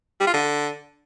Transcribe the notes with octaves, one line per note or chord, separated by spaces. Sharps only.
G3
F4
D3